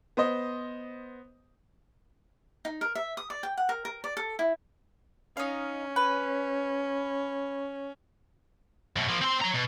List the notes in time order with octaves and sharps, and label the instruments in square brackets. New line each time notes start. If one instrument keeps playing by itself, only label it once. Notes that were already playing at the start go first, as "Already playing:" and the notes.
[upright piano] B3 C5 D#5
[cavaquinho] D#4
A#4
E5
D#6
D5
G5
F#5
A#4
A#4
D5
A4
E4
[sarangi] C#4 [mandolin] D#4 F5
[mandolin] B4
[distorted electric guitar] F#2 B2
F3 A#3
C4 C6
C#5 A#5
B2